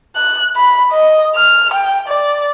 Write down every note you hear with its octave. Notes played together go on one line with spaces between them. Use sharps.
F#6
B5
D#5
F6
G5
D5